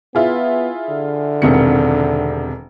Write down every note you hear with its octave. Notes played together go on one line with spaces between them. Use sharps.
B3 E4 F4 G#4
D3
E1 C3 D#3 C#7